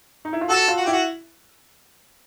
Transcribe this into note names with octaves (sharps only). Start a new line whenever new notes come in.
D#4
E4
F4
F#4 A4
F4
F#4
G4
E4 F#4